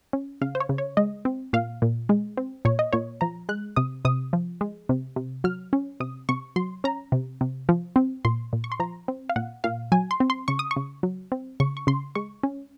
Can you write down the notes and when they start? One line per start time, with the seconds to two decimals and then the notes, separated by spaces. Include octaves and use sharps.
0.13 C#4
0.41 C#3 F5
0.55 C5
0.60 C#5
0.69 C#3
0.78 C#5
0.97 G#3 D#5
1.25 C4
1.53 A#2 F5
1.82 A#2
2.09 G#3
2.37 C4
2.65 A#2 C#5
2.79 D#5
2.93 A#2 C#5
3.21 F3 A#5
3.49 G#3 F#6
3.76 C3 D#6
4.05 C3 D#6
4.33 F3
4.61 G#3
4.89 C3
5.16 C3
5.44 F#3 F6
5.73 C#4
6.00 C3 D#6
6.29 C3 C#6
6.56 F#3 C6
6.84 C#4 A#5
7.12 C3
7.41 C3
7.69 F3
7.96 C4
8.25 A#2 C6
8.53 A#2
8.64 C#6
8.72 C6
8.80 F3 A#5
9.08 C4
9.29 F5
9.36 A#2 F#5
9.64 A#2 F5
9.92 F#3 G#5
10.11 C6
10.20 C4
10.30 C6
10.48 C#3 C#6
10.59 D#6
10.71 C#6
10.76 C#3
11.03 F#3
11.32 C4
11.60 C#3 C#6
11.77 C#6
11.87 C#3 C6
12.15 G#3 C#6
12.43 C#4